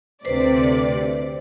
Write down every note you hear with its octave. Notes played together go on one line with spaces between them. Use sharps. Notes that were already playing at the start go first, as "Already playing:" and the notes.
D2 C3 B4 C5 D5